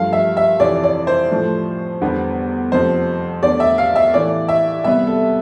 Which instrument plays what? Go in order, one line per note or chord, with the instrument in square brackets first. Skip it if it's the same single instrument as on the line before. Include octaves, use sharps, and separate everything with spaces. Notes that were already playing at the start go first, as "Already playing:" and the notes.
Already playing: [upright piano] G2 F3 A3 F5
E5
E5
F2 C3 E3 D5
D5
C5
A2 F3 A3
E2 D3 G3 B3
F2 C3 F3 A3 C5
E2 D3 A3 D5
E5
F5
E5
A2 E3 A3 D5
E5
C3 G3 B3 E5
A4